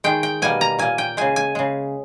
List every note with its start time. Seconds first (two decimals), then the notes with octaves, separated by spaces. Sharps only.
0.04 D#3 G#3 G5
0.23 G5
0.42 B2 G3 A#3 G#5
0.61 A#5
0.79 A#2 A#3 G#5
0.98 G5
1.17 C#3 G#3 G#5
1.36 G#5
1.55 C#3 G#3